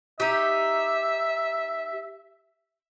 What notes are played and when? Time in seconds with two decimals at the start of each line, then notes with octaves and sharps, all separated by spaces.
0.20 D#4 G4 E5